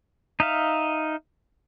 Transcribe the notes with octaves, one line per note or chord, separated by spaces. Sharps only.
D#4 E5 F5